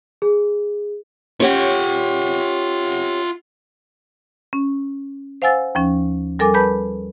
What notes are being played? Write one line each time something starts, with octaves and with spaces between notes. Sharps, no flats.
G#4
C#4 F4 G4 C#5 F#5
C#4
C5 F5 F#5 G#5 E6 A6
D#2 F3 C#4
G3 A4 A#4 G#5 D6
B4 A5 B5 G6